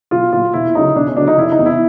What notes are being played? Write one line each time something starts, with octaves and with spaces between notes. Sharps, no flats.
B1 F4
A#2 F#3 F4
E1 E4
D2 C#3 F#3 D#4
E1 D4
C#4
D2 C#3 F#3 D4
D#4
F1 E4
D#4
E2 C3
E4